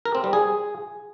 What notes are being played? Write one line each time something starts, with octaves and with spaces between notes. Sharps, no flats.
A#4
C4
G3
G#4